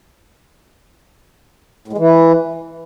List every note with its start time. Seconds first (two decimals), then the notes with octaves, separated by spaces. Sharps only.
1.88 A2
1.93 G#3
1.98 E3